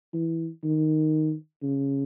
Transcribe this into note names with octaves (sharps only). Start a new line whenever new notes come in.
E3
D#3
C#3